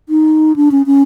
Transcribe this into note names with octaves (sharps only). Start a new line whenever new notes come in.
D#4
D4
C#4
C#4